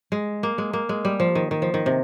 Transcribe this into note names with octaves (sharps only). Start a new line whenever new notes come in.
G#3
A#3
G#3
A#3
G#3
G3
F3
D#3
D#3
F3
D#3
C3